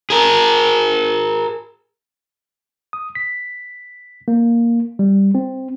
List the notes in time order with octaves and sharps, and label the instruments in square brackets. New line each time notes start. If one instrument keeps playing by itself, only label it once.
[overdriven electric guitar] G#4 A#4
[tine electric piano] D#6
B6
A#3
G3
C4